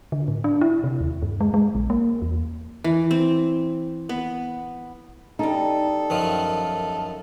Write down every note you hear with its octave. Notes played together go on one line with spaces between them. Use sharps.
D3
A2
D4
E4
C3
D#2
G2
G#3
G#3
A#1
A#3
E2
E3
C4
B3
E2 G3 D#4 A4
F#2 D#3 F3